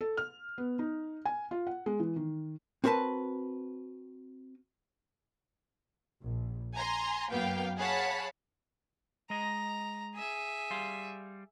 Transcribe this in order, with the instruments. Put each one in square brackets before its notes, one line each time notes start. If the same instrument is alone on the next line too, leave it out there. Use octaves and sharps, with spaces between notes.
[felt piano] A4
F6
B3
D#4
G#5
F4
F#5
G#3
E3
D#3
[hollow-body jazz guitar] C4 F#4 A#4 B4 A5
[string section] A#1
G#5 A#5 C6
F#2 A#3 B3 F5 G5
G#4 C#5 F5 F#5 A5 B5
[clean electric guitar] G#3 D#5 [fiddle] A#5
[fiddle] G#4 E5
[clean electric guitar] G3 F5 C6